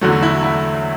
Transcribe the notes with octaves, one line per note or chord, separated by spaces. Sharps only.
E2 D3 F#3 A3 F#4
F#4
E4
E4